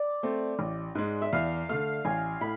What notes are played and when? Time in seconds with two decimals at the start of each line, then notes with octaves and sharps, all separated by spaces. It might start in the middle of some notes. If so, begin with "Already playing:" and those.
Already playing: D5
0.23 A3 C4
0.59 A1
0.95 G#2 G#3
1.22 E5
1.32 E2 F5
1.69 D3 A3 F5
2.05 A1 G#5
2.41 A2 B5